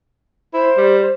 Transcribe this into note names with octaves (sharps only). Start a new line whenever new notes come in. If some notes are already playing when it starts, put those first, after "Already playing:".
E4 C5
G3